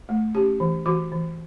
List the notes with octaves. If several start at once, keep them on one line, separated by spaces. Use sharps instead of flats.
A3
C#4 G4
E3
E3 F#4
E3